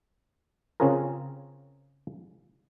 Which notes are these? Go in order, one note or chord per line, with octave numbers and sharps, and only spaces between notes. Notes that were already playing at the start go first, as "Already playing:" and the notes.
C#3 C4 C#4 F4 G#4 A#4